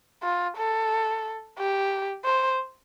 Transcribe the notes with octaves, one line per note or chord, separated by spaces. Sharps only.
F4
A4
G4
C5